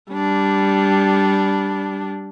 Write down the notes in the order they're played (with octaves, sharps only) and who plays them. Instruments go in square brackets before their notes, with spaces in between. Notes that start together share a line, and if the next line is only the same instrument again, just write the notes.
[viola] G3 D4